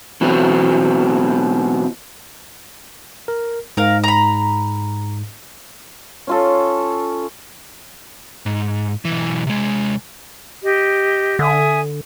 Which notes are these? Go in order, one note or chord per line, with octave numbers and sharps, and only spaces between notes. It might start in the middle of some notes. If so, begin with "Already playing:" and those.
B2 E3 F#3 B3 C4
A#4
G#2 A#4 F5
A#5 B5
C#4 F4 A4
G#2
B1 E3
C3 G#3
G4 D#5
D3 E5 G#5 D#6